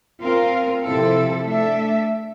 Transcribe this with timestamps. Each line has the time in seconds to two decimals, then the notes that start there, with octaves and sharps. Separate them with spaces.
0.21 C4 F4 A#4 F5
0.83 C3 F3 C4 E4 A4
1.44 A3 D4 A4 E5